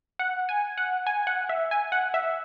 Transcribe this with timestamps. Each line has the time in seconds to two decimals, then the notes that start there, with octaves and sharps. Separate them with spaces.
0.19 F#5
0.49 G#5
0.78 F#5
1.07 G#5
1.27 F#5
1.49 E5
1.71 G#5
1.92 F#5
2.14 E5